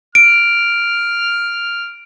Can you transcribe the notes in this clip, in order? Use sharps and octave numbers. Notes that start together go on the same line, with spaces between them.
F6 D7